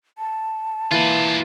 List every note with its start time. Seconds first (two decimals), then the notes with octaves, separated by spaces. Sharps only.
0.18 A5
0.91 E3 A#3 F4 B4